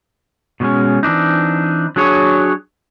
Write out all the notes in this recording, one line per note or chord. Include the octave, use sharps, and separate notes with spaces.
B2 D#3 G3 G#3 C#4
E3 C4 D4 D#4
F#3 D4 G#4 C#5